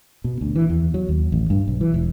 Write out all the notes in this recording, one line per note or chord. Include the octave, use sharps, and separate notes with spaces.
B2
D2
E3
E2
F#3
D#2
A1
G2
B1
E3
E1